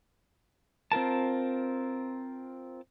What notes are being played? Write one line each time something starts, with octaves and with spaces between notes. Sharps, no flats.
C4 F4 A#4 A5